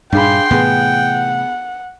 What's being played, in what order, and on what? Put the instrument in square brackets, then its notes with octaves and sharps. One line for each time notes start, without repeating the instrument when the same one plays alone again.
[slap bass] G2 A#2 [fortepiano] D4 G#4 B5 [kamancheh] F5 C6 [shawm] G5
[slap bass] A2 C3 E3 [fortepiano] B3 G#4 [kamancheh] F#5